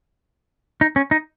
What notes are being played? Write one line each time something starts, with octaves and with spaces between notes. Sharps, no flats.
D#4
C#4
D#4